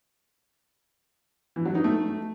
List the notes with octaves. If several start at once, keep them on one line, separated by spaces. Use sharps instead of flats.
E3
F#3
D#4
A3